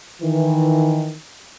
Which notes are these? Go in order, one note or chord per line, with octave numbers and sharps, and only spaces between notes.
D#3 E3